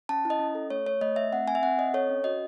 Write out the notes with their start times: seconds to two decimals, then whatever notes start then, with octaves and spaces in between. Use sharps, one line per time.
0.09 C#4 A5
0.25 E4
0.30 D#5
0.39 C#4
0.55 A4
0.70 A3 C#5
0.86 A3 C#5
1.01 A3 D#5
1.16 A3 E5
1.33 C4 F#5
1.47 C4 G#5
1.55 E5
1.63 C4 F#5
1.78 C4 D#5
1.94 A4 C#5
2.09 C#4
2.24 F#4 D#5